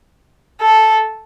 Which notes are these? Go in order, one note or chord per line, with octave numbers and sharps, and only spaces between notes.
A4